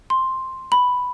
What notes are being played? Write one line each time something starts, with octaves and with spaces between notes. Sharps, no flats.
C6
B5